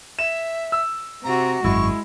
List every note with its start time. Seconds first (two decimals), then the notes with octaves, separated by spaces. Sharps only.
0.19 E5 E7
0.72 E6
1.24 C3 F#4 A#5
1.64 G#1 F#2 G#3 E4 C#6